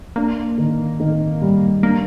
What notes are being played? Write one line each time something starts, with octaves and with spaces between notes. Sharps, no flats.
A#3 D4
D#3
D#3
G3
A#3 D4